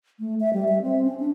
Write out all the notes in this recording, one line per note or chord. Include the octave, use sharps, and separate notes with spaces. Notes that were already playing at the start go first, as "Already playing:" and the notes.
A3
E5
G3
E5
C4
C#4
D4